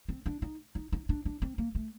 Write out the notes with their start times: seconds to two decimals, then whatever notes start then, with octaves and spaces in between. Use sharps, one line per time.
0.09 C4
0.26 D4
0.42 D#4
0.75 D#4
0.92 D#4
1.09 D4
1.25 D4
1.42 C4
1.58 A#3
1.75 A3